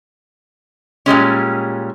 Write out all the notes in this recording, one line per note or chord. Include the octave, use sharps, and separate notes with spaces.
A#2 G3 G#3 C#4